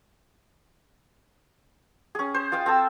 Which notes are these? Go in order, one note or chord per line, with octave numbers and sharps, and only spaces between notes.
C#4 G#4
C5
F4 D#5 F5 G5
C4 A4 E6